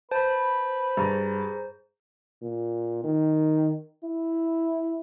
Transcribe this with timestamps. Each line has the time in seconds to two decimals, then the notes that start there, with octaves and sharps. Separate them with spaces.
0.11 B4 C5 A5 B5
0.97 G2 G#4 A#5
2.42 A#2
3.04 D#3
4.04 E4